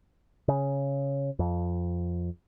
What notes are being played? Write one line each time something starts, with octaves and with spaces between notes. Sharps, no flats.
C#3
F2